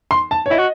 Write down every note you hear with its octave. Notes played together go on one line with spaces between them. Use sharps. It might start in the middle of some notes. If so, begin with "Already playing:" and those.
C6
A5
C#5
E4 D#5
F#4